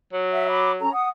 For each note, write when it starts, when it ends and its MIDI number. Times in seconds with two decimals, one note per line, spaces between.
0.13 0.84 54
0.32 0.46 76
0.32 0.46 78
0.48 0.71 83
0.48 0.71 86
0.80 0.90 61
0.80 0.90 69
0.80 0.90 82
0.93 1.08 78
0.93 1.08 87